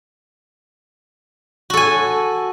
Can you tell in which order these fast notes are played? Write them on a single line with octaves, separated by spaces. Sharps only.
F#4 A4 G#5